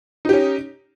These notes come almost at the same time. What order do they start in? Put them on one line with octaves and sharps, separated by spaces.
D#4 G4 C#4